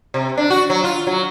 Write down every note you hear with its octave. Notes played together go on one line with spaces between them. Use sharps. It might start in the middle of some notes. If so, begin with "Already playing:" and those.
C3
D4
F#4
F#3
F4
F#3